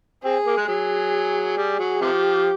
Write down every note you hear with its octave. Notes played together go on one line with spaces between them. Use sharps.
C4 G#4
A#3
G#3
F#3 G#4
G3
F#3
C3 F3 G4